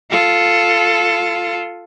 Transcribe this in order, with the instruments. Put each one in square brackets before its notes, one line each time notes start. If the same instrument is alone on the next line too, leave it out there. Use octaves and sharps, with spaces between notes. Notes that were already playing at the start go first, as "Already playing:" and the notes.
[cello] F4 A4